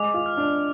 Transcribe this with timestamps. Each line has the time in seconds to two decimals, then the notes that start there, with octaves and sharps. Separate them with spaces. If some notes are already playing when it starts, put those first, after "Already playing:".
Already playing: G#3 D6
0.14 F4
0.26 F6
0.37 D4